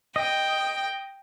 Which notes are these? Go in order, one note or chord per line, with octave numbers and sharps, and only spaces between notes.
D#5 G5